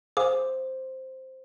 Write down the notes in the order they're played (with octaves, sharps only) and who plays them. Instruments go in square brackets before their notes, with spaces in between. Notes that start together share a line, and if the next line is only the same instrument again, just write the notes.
[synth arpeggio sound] G#4 F5 [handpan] C5 [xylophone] D6